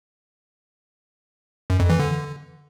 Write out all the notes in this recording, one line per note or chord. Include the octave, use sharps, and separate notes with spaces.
F#2
F2
E3
D3